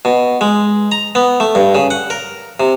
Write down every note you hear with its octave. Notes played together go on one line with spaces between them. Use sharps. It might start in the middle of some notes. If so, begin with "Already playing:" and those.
B2
G#3
A#5
B3
A3
G2
C#3
F#5
A#4
C3